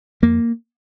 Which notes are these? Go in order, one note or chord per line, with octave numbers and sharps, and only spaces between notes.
F2 A#3